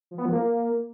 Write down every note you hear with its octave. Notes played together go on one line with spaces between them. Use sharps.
F3
B3
F3
A#3